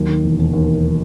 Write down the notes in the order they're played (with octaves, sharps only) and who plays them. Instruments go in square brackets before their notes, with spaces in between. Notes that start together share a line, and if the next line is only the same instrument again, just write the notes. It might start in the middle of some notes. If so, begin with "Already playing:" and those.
Already playing: [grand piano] D#2 F#3
D#3
E1
E1
D#2
D#3